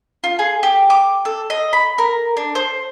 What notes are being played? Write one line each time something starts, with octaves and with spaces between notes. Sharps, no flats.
F4
G#4
G4
D6
A4
D#5
B5
A#4
D4
C5